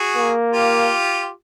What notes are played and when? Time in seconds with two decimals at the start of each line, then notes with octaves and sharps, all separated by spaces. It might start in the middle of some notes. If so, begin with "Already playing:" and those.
Already playing: F#4 G#4
0.17 A#3
0.53 F4 G4